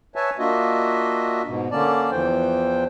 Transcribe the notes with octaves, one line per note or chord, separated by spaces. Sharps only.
B4 C#5 E5 G#5 A5
A#3 D4 F4 F#4 D#5 E5
G#2 B2
D3 A#3 C#4 D5 A5
E2 E3 F3 C5 G5